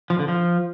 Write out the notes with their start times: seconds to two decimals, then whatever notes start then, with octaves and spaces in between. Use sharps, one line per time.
0.10 F3
0.19 D3
0.28 F3